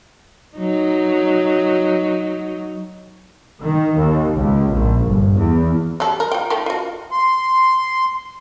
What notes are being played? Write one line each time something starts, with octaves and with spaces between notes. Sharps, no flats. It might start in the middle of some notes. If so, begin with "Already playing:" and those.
F#3 D#4
D#3
D#2
C#2
A#1
G1
E2
F#3 G3 A4
A#4
F4 G5
D#3 A3 G5
F4 F#4
C6